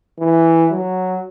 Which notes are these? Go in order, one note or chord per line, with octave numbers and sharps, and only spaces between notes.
E3
F#3